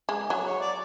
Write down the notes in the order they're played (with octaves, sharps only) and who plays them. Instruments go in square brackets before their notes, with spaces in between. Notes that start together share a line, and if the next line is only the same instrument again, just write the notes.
[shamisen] G#3
F#3
[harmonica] C#5
D5